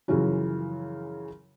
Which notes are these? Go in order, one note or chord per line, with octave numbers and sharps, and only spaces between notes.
F#2 C#3 E3 F3 C#4 F#4